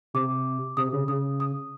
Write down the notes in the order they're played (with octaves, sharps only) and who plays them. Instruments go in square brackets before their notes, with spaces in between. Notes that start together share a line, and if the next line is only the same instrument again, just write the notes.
[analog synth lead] C3 [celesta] D6
[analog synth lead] C3 [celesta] D#6
[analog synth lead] C#3
[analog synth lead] C#3 [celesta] D#6
[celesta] D#6